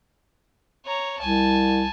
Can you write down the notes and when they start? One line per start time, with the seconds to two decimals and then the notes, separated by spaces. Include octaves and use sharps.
0.86 C#5 A#5
1.20 C2 G#5 A5